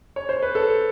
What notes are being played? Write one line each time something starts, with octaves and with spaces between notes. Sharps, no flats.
C#5
C5
B4
A4